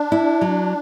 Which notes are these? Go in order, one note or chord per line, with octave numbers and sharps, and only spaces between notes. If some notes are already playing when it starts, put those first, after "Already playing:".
Already playing: D4
E4
F#3